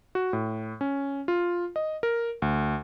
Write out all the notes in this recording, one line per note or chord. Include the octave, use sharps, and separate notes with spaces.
F#4
A2
C#4
F4
D#5
A#4
D2